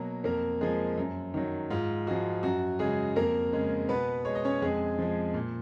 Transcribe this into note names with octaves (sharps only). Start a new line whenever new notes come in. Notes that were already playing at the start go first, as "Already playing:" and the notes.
Already playing: B2 F#3 A#3 A#4
F2 A#3 A#4
F3 G#3 G#4
F#2
D#3 F#3
G#2 F4
F3 G#3 F#4
F#2 F#4
C#3 G#3 G#4
F2 A#3 A#4
C#3 G#3
B2 B3 B4
G#3 C#5
D#5
C#4 C#5
F2 G#3 G#4
F3 G#3
A#2